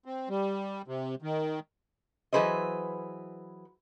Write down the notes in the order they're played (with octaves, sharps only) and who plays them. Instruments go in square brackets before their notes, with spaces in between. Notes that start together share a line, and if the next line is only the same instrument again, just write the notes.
[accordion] C4
G3
C3
D#3
[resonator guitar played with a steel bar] E3 F#3 G#4 B4 C5 D#5